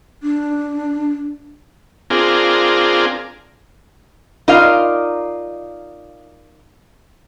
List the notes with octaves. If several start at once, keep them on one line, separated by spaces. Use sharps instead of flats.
D4
C4 D4 F4 G#4 A#4
D#4 F4 A#4 D5 D#5 F5